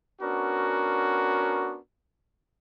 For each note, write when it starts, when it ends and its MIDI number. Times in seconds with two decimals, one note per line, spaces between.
0.20 1.77 59
0.20 1.77 61
0.20 1.77 62
0.20 1.77 66
0.20 1.77 70